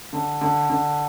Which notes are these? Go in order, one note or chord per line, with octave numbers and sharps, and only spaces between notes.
D3
D3
D3